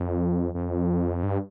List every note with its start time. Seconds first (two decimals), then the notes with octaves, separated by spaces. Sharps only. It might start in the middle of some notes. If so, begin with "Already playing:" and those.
Already playing: F2
0.54 F2
1.23 G2